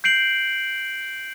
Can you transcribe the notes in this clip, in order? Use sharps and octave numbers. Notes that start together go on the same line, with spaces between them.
G6 C7 D7 F#7